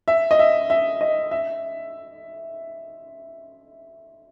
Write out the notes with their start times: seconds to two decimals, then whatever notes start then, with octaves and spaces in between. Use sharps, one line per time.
0.08 E5
0.31 D#5
0.39 E5
0.70 E5
1.01 D#5
1.31 E5